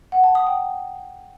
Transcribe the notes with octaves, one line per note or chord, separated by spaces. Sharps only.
F#5
A5
D#6
G5